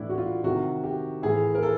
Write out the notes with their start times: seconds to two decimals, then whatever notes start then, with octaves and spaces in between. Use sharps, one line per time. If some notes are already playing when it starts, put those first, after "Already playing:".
Already playing: A2 E3 D4 E4
0.09 F#4
0.18 F4
0.44 C3 D#3 F#4
0.84 G4
1.23 A2 E3 G#4
1.55 A#4
1.63 A4